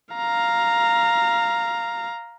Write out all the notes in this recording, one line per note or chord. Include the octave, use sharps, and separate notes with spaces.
F5 A#5